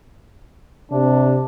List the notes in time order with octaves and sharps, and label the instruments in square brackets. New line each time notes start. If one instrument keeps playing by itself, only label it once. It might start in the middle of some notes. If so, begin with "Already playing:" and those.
[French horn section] C3 [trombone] D4